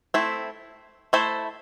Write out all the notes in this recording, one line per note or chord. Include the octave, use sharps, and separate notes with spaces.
A3 C4 E4
A3 E4 A4 C5